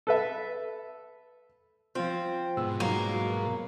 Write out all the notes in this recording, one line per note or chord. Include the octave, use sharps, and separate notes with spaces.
A4 B4 E5
F3 C4 F4
G#2 B2 E6
F#3 A#3 D#4
F#4